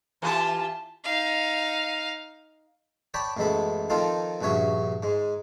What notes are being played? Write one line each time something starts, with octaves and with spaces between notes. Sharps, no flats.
E3 F4 G4 A5
D#4 F5
C#5 D5 G5 A5 B5
A1 F#2 G#3 B3 A4 B5
D#3 F3 C4 D#4 F4 A4
A#1 G2 C#3 F#4 C#5 E5
G#2 G#3